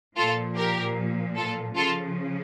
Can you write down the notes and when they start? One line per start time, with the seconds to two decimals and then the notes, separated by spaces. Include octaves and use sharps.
0.16 A#2 F3 F4 A4
0.56 G4 A#4
1.36 F4 A4
1.76 C#3 F3 F4 A4